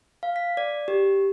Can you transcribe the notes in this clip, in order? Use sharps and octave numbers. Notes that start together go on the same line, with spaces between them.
F5
B6
D5
G4